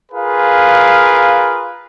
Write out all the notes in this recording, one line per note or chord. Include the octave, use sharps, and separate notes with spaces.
F4 G#4 A#4 B4 F5